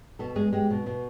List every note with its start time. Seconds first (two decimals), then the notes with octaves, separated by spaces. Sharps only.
0.19 B2 A4
0.36 G#3 G#4
0.53 G#3 G4
0.70 B2
0.86 B2